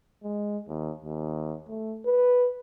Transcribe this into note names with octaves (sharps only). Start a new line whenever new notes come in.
G#3
D#2
D#2
A3
B4